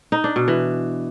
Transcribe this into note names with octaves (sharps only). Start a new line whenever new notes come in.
D#4
D4
B2
E3